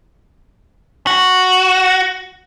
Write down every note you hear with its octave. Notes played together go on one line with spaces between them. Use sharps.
F#4